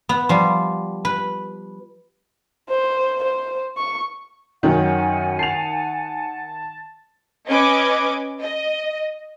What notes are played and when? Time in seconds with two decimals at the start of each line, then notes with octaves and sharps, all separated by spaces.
0.09 B3
0.29 F3 G3
1.05 B4
2.69 C5
3.23 C5
3.77 C#6
4.63 F#2 D#3 C#4 F#5 G#5
5.39 A5 C7 F7
7.49 C#4 B4 D#5 D6 G#6
8.42 D#5